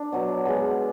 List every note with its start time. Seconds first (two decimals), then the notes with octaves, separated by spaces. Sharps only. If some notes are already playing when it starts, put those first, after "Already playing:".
Already playing: D4
0.12 B2 F#3
0.45 B2 G#3 B3